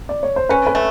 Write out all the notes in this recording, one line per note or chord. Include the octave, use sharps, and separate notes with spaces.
D5
C#5
C5
C#4 B4
B4
A3